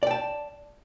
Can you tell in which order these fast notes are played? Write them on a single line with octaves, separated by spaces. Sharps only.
D5 G5 A5